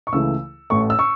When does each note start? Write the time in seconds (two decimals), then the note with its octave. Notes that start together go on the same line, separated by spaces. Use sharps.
0.07 C#6
0.12 C#2 C#3 E3 A3 E4 E6
0.70 A1 A2 A3 C#6
0.90 E6
0.99 C#6